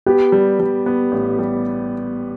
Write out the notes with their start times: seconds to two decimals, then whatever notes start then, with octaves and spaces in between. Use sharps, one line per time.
0.06 B3 G4
0.32 G3
0.60 G3
0.86 B3
1.12 A1
1.39 G3